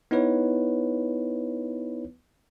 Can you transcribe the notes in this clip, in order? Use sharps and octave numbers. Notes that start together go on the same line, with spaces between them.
B3 D#4 E4 B4 C#5